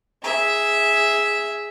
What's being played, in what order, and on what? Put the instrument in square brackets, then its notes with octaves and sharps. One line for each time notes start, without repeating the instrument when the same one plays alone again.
[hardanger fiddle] G#4 E5